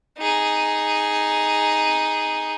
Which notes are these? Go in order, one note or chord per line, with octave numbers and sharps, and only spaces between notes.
D#4 G#4